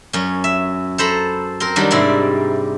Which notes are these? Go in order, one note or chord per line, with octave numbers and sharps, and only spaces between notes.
F#2 C#4
E5
A4 C5 A#5 B5
C4 A#4
D#3 F#3 G3 D4
G#2 C3 G3 E4 D5